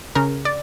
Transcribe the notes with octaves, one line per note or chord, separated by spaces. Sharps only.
C#3 A#4
D5